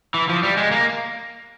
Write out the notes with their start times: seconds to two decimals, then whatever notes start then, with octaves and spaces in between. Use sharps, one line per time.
0.14 E3
0.29 F3
0.43 G3
0.57 G#3
0.71 A#3